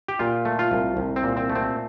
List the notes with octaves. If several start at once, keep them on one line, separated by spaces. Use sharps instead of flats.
G4
A#2 F4
A3
F4
C2
C2
C4
A#2
C4
A3
C4